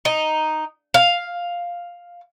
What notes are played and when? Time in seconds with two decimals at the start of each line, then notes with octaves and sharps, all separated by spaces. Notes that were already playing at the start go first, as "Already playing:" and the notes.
0.05 D#4
0.94 F5